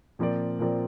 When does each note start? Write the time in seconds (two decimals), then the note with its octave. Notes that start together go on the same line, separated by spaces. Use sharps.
0.19 A#2 F3 C4 A#4 D5
0.59 A#2 F3 C4 A#4 D5